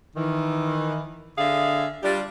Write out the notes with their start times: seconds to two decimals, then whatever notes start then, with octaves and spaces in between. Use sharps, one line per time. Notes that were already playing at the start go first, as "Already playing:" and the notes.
0.15 D#3 E3
1.38 D3 G#4 E5 F5
2.03 G3 D4 F4 G4